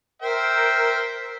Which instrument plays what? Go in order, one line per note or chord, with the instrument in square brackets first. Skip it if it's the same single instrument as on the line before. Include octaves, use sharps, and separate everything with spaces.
[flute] A#4 [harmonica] C5 E5 G5